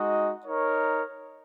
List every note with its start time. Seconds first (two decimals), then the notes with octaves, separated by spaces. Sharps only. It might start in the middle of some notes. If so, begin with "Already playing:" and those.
Already playing: G#3 D#4 F#4 D#5
0.46 D#4 A#4 C#5